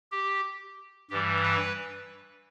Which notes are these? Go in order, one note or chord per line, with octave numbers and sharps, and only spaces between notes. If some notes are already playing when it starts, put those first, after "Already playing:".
G4
G2 E3 G3 G4
B4